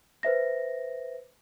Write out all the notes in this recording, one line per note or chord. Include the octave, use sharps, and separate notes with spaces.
B4 C5 E5 A#6